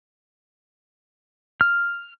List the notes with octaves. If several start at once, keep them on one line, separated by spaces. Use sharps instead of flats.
F6